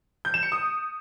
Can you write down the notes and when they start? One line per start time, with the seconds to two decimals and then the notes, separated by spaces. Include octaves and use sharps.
0.25 G6
0.34 E7
0.43 C#7
0.52 D#6